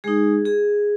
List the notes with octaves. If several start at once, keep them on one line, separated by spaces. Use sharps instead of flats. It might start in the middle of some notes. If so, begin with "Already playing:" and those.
G#3 D#4 G#4
G#4